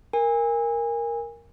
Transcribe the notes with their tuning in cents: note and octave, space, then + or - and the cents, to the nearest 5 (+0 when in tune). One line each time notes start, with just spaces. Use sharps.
A#4 +0 G#5 -25